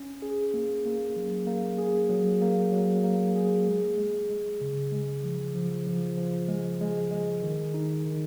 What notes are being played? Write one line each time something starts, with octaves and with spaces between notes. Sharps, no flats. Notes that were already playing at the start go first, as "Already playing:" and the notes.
Already playing: C#4
G#4
A#3
A#3
F#3
A#3
G#4
F#3
A#3
F#3
A#3
G#4
G#3
G#3
G#3
C#3
G#3
F3
F3
F3
F3
G#3
G#3
G#3
D#3
D#4
D#3